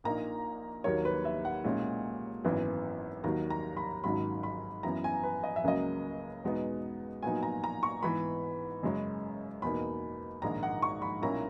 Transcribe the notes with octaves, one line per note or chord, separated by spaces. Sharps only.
A#1 A#2 A#3 D#4 A#5
D#2 D#3 F#3 A#3 C#5
B4
E5
F#5
B1 A#2 G#3 C#4 E4
G#1 F#2 E3 B3
D#2 D#3 F#3 A#5
A#5
B5
G#1 G#2 D#3 F#3 C#4 B5
B5
F#2 E3 B3 E4 A#5
G#5
B4
D#5
E5
C#2 C#3 F#3 A#3 D#5
E2 B2 G#3 B3 D#4
A#2 F#3 B3 D#4 G#5
A#5
A#5
C#6
G#2 E3 B3 B5
F#1 F#2 C#3 G#3 C#4
E2 B2 A#3 D#4 B5
A#1 G#2 D#3 G#3 A#5
F#5
C#6
B5
B1 A#2 A#3 C#4 E4 A#5